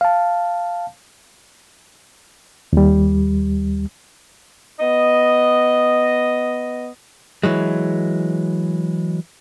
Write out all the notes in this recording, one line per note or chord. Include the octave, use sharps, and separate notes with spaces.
F5 A5
D#2 G3
B3 D#5
E3 F#3 G#3